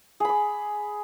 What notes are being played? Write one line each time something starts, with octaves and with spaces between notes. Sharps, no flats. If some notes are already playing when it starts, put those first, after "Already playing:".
G#4 B5 D6